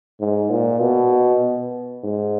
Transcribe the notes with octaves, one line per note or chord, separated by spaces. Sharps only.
G#2
A#2
B2
G#2